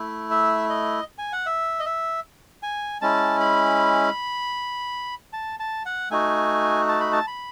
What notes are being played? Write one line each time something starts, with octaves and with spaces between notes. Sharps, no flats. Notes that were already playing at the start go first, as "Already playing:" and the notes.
Already playing: A3 E4
E5
D#5
G#5
F#5
E5
D#5
E5
G#5
G#3 C#4 E4 A5
B5
A5
A5
F#5
A3 D#4 F#4 G#5
A5
B5
A5
B5